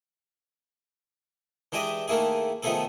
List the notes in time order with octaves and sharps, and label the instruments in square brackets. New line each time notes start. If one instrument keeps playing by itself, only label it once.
[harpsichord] E3 G#3 D4 G4 D#5 E5
D#3 A3 A#3 E4 G#4
D#3 F3 A3 B3 G#4 A4